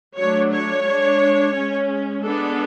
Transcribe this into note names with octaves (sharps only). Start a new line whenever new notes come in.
F#3 A3 D4 C#5
C#5
G#3 D4
G#3 C#4
G#3 B3 D4 A4